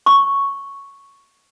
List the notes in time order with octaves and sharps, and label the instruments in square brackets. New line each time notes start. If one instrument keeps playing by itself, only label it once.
[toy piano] C#6